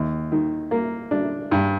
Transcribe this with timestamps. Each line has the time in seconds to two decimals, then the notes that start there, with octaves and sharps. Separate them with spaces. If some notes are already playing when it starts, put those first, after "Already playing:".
Already playing: D#2
0.32 D#3
0.71 A#3
1.11 D4
1.51 G2